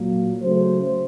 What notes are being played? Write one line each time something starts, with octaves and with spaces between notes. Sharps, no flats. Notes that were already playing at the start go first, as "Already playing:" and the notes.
Already playing: A#2 F#3 A#3
C#3 F#3 A3 C5